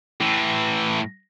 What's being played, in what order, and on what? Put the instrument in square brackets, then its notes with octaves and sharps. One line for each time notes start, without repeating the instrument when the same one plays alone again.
[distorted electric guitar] A2 E3